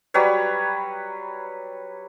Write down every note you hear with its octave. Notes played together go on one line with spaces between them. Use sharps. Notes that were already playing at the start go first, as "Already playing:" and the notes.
F#3 G3 B4 C#5